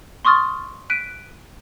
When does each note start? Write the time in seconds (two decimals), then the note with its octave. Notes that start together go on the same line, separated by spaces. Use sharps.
0.25 C6 C#6 D#6 F6 A6
0.90 F#6 B6 D7 D#7